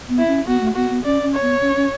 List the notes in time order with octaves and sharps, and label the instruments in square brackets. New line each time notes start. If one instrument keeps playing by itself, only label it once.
[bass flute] B3
[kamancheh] E4
[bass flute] C#4
[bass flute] B3 [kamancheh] F#4
[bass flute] A3
[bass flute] B3 [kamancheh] F#4
[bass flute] B3
[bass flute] C#4 [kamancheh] D5
[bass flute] C#4
[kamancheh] C#5
[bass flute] B3
C#4
C#4